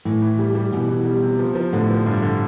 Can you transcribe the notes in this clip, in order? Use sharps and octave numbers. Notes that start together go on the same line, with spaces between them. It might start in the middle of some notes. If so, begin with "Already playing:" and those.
A2 E3
E3
G3
G3
B2 E3
E3
G3
C3
F3
F3
A2 D3
F3
G2
D3